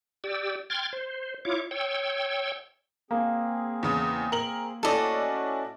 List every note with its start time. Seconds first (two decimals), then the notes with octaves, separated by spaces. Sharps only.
0.24 G4 D5 E6
0.70 G5 C6 F6 G#6 A6
0.93 C5
1.45 E4 F4 C#5 D6
1.71 C#5 G5 E6
3.11 A#3 C4 G#4
3.83 E2 C#3 D#6
4.32 A#4 F#7
4.83 A3 C#4 E4 F#4 A4 D5 D#5